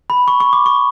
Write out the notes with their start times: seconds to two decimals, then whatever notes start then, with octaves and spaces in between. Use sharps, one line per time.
0.10 B5
0.28 C#6
0.40 C#6
0.53 D6
0.66 C#6